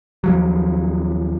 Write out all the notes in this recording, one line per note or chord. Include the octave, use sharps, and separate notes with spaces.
D#2 F3 F#3